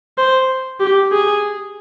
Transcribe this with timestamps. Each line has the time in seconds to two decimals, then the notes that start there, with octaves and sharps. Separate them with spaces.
0.18 C5
0.80 G4
1.12 G#4